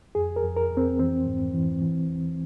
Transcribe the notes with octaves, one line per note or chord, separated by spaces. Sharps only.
F2 G#4
A#4
F2
A#4
F2
C4
E3 C4
G#2
E3
E3
E2